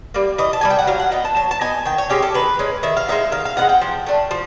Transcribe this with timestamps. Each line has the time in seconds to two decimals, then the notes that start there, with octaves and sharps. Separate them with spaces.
0.14 G3 A#3
0.38 E3 D#5
0.53 A5
0.61 G3 A#3 G#5
0.70 G5
0.79 F#5
0.87 F#3 F5
1.00 F#5
1.12 B3 D#4 G5
1.25 A5
1.36 F#3 A5
1.51 A5
1.61 B3 D#4 G#5
1.86 D#3 G5
1.98 C#5
2.10 G#3 C#4 G4
2.22 A4
2.35 D#3 B4
2.59 G#3 C#4
2.83 D#3 E5
2.97 F5
3.09 G#3 B3 D#4 E5
3.32 D#3 F5
3.45 F5
3.57 G#3 B3 D#4 F#5
3.69 G5
3.81 F3
4.06 A3 D4
4.31 F3